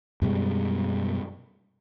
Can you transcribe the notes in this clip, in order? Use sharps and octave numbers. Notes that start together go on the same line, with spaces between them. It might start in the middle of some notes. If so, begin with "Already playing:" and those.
F#2 B2 G3 G#3